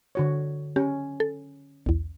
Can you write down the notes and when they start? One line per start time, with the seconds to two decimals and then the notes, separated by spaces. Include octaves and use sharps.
0.15 D3 F#4 C#5
0.76 C#4 G4
1.20 A4
1.86 B1 E2